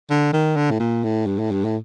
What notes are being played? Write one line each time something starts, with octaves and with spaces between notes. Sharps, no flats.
D3
D#3
D3
A2
A#2
A2
G2
A2
G2
A2